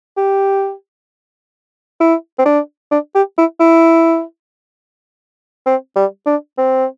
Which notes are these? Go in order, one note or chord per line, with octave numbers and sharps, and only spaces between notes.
G4
E4
C4
D4
D4
G4
E4
E4
C4
G3
D4
C4